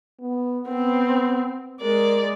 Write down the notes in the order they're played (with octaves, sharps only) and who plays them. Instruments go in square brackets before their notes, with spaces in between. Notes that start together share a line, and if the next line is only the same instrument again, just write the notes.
[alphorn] B3
[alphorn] B3 [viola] C4
[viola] G#3 D5 [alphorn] A#4